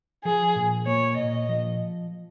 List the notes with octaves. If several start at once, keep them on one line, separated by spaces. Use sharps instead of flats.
F3 G#4
A#2
A#3 C#5
A#2 D#5
F3